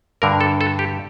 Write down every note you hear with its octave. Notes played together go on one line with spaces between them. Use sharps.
G2 D3 A#4
A4
A4
G4